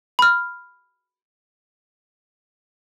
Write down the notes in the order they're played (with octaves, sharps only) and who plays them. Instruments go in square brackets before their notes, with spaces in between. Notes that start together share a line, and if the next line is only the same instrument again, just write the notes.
[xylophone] B5 F6